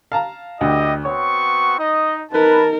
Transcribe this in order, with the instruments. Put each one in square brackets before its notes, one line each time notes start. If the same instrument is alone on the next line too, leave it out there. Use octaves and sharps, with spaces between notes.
[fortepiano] F5 A5 A#5
[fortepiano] D2 [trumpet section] E4 G4 [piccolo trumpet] D#5
[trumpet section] B3 C4 F#4 [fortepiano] C#5 [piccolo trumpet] C#6
[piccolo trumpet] D#4 [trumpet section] D#5
[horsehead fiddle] D#4 A#4 [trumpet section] B4 [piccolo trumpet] A5